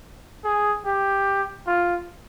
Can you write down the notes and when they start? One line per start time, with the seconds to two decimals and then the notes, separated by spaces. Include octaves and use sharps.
0.44 G#4
0.86 G4
1.67 F4